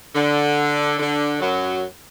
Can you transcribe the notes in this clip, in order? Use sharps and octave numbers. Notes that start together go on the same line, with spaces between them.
D3
D3
F#2 F#3